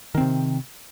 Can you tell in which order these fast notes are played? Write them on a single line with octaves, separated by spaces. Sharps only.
D#3 C4 C3